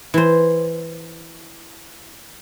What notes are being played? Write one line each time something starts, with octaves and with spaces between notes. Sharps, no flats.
E3 C5